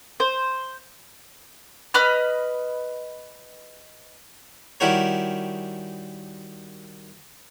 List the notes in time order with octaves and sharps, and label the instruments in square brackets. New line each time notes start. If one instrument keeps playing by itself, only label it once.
[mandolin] C5
B4 D#5 B5 F6
[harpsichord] D#3 G3 E4 F#4 A#4 C#5